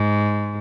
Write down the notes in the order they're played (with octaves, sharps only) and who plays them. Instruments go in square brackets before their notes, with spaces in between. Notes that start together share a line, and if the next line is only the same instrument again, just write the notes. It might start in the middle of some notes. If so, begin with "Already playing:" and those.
Already playing: [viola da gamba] G#2